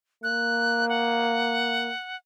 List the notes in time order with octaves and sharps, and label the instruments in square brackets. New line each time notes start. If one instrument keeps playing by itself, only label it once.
[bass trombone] A#3 [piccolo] F#6
[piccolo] F#5